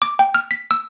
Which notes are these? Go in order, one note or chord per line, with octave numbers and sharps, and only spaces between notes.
D6
G5
F6
B6
E6